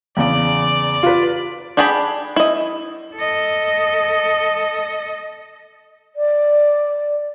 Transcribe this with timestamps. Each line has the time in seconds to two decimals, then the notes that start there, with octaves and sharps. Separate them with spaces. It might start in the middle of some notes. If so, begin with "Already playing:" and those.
0.17 E2 C#3 D5
1.03 F4 B4
1.77 D4 G4 G#4 A5 B5
2.36 E4 D#5
3.15 A4 D#5
6.16 D5